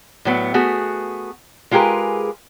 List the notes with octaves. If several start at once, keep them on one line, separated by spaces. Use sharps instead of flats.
A2 F#3 B3
A3 B3 F#4 G#4
G#3 F4 G4 G#4 A#4 B4